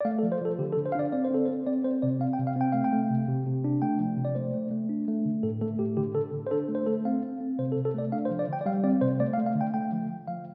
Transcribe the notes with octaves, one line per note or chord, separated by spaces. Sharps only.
D5
A3 F5
A4
F3
C5
F3 A4
D3 G4
A4
D3
C5
F5
D4 D5
C4 D5
C5
C4 A4
C5
C4
C4 D5
C4 C5
C3 D5
C4 F5
G5
C3
F5
C4 G5
A3 F5
G5
A3
C3
C3
C3
D4
A3 G5
F3
C3
D5
A3 C5
A3
A3
D4
A3
D3
A2 A4
A3 A4
A2 G4
D3 G4
D3 A4
D3
C5
D4 A4
A3
C5
A3 A4
C4 F5
C4
C4
C3 C5
A4
C3
A4
A3 D5
D4 F5
C5
F3
D5
D3 G5
D5
G3 F5
C4 D5
C3 C5
A3 D5
F5
A3
F5
D3
G5
A3 G5
F3
F3
F3 F5